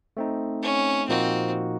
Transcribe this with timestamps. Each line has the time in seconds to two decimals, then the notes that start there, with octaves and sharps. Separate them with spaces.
0.17 A3 C4 D#4
0.62 C#4
1.08 A#2 F3 A#3 C4 D#4 F#4